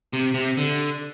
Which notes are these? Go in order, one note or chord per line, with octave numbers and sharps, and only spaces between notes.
C3
C3
D3